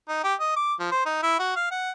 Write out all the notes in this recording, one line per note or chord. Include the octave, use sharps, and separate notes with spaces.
D#4
G4
D#5
D6
F3
C5
D#4
E4
F#4
F5
F#5